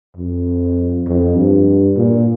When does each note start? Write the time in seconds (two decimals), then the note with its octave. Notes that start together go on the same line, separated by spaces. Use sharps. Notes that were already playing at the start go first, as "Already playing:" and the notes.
0.17 F2
1.07 F2
1.37 G2
1.97 A#2